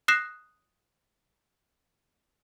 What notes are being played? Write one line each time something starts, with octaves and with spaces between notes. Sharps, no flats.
D#6 F#6 A#6 C7 E7